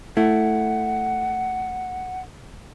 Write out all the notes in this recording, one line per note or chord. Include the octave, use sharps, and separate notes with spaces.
A3 E4 F#5